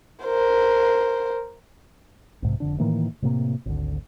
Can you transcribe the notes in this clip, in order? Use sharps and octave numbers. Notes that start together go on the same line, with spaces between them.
A#4 C5
B1 G#2 C3
F1 D3 D4
A2 D#3 E3 A#3
A2 C3 A#3
G#1 D2